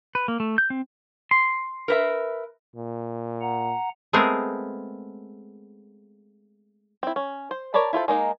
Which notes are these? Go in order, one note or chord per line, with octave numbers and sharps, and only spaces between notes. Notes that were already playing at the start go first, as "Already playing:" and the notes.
B4
A#3
A3
G6
C4
C6
A#4 B4 E5
A#2
F#5 A#5
G#3 A3 B3 C4 G#4 A#4
C4 E4
C#4
C5
A#4 C#5 D5 A5 B5
E4 F4 A4 C5
G#3 A#3 D#4